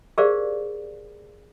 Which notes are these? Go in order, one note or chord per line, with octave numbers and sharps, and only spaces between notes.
G4 G#4 A#4 C5 D5 F5